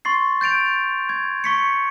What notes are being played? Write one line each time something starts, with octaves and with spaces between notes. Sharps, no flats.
C6 C#6 A6 C7
G6 A6 D7 F7
G#6
C#6 B6 C#7